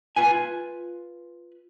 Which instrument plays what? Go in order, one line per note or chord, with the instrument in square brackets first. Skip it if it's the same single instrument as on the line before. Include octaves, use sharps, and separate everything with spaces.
[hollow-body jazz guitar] F4 B4 G#5